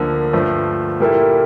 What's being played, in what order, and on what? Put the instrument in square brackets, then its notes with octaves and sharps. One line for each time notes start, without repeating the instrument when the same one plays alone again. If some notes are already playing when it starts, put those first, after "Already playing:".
Already playing: [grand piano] D2 D3 F3 A#3
G2 F3 A3
A#2 G3 A#3 E4 A4